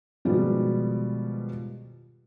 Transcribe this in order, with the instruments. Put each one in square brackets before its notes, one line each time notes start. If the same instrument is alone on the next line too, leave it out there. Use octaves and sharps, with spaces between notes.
[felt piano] B2 D#3 F3 G3 G#3